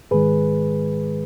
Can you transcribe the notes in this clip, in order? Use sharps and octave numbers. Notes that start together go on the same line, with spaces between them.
G#2 D#3 G#3 G#4 B4